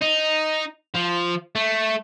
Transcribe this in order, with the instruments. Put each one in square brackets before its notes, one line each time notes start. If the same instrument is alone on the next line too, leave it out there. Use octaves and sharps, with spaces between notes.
[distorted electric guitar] D#4
F3
A3